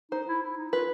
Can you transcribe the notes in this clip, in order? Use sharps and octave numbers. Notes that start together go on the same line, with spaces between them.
D#4 C5
E4
E4
D#4
F4 B4